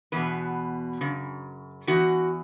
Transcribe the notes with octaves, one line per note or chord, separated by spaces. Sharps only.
E2 B2 B4
F#2 C#3
E2 E3 F#4